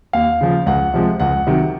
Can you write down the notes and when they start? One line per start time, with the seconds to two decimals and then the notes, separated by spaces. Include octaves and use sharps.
0.13 D#2 F5
0.41 C#3 F3
0.66 C#2 F#5
0.94 C3 F3 G#3
1.20 C#2 F#5
1.47 C3 D#3 F#3